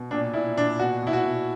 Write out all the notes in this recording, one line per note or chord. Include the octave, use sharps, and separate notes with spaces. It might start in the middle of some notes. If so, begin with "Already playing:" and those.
Already playing: B2
A#2 D4
A#2 E4
A#2 D4
B2 F#4
B2 E4
F#4
B2